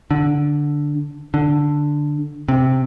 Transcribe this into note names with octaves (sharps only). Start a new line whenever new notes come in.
D3
D3
C3